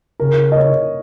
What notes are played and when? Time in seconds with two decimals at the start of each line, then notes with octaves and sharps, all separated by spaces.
0.20 C#3 A#4
0.52 D#5
0.57 C#5